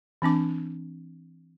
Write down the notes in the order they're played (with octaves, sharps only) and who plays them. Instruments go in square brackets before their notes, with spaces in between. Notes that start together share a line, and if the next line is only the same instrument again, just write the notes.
[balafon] E3 C4 D4 D6